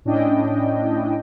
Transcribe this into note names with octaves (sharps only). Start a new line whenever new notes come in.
A2 C#4 D4 E4 D#5 G5